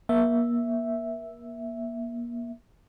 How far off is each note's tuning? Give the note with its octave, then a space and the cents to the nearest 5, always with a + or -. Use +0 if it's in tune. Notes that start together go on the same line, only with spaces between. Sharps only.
A#3 +35 E5 +0